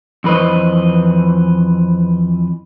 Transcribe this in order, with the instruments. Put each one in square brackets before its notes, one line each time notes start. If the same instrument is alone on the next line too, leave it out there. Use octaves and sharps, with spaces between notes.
[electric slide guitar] F2 E3 B4 C5 D#5